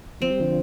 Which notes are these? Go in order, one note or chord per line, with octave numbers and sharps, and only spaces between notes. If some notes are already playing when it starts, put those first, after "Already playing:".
F3 C4
G3
D3 F3